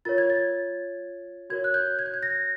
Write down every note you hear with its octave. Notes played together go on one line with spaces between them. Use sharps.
F4 A#4 C#5 A6
G#6
A6
F#4 A#4 C#5 G#6
F#6
G6
G#6
G6
G#6
A#6